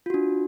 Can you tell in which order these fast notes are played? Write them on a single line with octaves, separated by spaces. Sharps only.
F4 F#4 D4